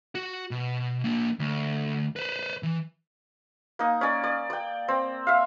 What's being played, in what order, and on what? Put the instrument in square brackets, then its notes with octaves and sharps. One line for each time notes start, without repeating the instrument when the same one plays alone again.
[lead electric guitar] F#4
B2
A#3 D4
D2
B4 C5
E3
[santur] A#3 D#4
C#4 D#4 D5
D5
D5 G5
C4
E5 F5